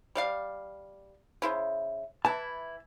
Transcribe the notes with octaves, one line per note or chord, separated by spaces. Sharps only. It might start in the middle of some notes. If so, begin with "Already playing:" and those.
G3 D5 F5
C#3 E4 C5
E3 E4 A5